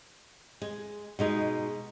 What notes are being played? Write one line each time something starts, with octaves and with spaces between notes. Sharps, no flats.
G#3
B2 G#3 D#4